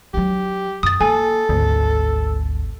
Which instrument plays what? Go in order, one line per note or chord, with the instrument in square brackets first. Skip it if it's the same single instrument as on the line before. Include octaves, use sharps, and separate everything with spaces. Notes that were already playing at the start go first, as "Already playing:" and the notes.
[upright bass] F#3 D4 [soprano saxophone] G4
[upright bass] F#2 [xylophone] D#6 A6
[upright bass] A#3 [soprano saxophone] A4 [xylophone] G#5
[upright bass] G#1 [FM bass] D2